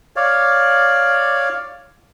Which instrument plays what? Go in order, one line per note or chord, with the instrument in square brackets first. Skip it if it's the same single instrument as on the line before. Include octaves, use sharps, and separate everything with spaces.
[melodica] C#5 D5 F5